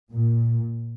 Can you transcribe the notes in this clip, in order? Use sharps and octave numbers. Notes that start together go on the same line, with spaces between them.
A#2